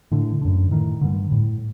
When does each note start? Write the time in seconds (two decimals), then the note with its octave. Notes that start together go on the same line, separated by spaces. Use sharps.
0.12 A2 D3
0.42 F#2 D3
0.71 A2 D#3
1.01 G2 D3
1.32 A2